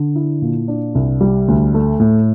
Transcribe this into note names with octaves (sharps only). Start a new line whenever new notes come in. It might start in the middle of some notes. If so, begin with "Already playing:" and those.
Already playing: D3
E4
A#2
D4
C2
G3
D2
A3
A2